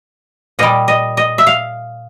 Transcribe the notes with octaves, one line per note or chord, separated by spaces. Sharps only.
A#2 G3 D#5
D#5
D#5
E5
F5